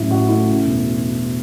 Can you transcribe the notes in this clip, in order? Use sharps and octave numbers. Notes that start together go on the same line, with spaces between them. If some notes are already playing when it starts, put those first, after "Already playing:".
Already playing: A1 F#3 E4
A2 F#4
A3 E4
C#3
E1